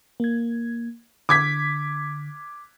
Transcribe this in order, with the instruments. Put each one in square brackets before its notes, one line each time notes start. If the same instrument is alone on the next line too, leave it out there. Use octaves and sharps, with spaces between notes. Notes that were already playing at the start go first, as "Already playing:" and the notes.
[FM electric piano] A#3 G#6
[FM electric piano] D3 [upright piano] D6 G#6 B6